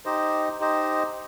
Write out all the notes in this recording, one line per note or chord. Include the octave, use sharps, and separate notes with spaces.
D#4 G4 C5 D#5
D#4 G4 C5 D#5